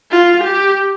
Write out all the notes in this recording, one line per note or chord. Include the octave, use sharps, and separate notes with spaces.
F4
G4